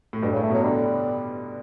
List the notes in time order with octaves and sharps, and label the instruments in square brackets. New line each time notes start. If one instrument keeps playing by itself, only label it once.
[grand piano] A2
[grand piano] G2 [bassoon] B2
[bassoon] C#3
[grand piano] A2
[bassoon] A3
[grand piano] B2 [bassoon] F#3
[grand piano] D3 [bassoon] G3